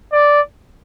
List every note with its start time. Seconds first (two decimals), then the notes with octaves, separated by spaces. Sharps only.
0.13 D5